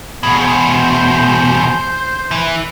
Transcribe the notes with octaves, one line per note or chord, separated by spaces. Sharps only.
E2 B2 G#4
C5
E3